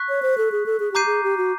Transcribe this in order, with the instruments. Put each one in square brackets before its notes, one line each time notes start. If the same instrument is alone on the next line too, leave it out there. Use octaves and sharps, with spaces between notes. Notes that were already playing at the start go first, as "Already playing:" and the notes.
Already playing: [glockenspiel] C#6 F#6 B6
[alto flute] C#5
C5
A4
G#4
A4
G#4
[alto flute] G4 [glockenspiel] A#5 D6 G6 C7 D#7
[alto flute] G#4
G4
F#4